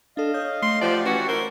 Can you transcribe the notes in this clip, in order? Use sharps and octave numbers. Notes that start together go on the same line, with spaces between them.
D4 A4 D#5 F5
C#5 D#6 G6
A3 C6
F3 G4 D5 F#5 A5
E3 C#4 F#4
F#2 E4 A#4 C5